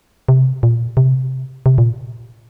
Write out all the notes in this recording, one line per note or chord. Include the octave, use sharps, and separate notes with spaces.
C3
A#2
C3
C3
A#2